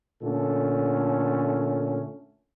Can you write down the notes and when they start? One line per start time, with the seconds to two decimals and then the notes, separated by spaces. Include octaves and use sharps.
0.23 A#2 D3 A3 C#4 A4